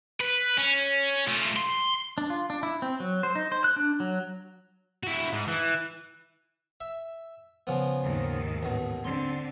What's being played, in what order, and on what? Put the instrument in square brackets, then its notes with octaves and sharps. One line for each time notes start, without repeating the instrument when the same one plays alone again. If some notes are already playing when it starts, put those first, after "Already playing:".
[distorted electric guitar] B4
C#4
A3 F4
C6
[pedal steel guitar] D4
F4
D4
E4
C4
F#3
C5
D#4
C5
F#6
D4
F#3
[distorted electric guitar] E4 F#4
G#2
E3
[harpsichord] E5
C#3 F3 B3
[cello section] D#2 G#2 D#3
[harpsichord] A1 B2
[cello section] D3 C4 [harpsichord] C6